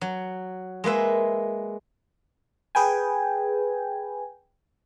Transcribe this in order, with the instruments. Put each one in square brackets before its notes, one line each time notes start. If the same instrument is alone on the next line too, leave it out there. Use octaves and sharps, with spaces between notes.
[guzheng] F#3
G#3 A#3 B4 E5
[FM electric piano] G#4 B4 G5 G#5